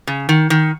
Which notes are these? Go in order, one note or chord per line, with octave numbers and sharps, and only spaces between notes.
C#3
D#3
D#3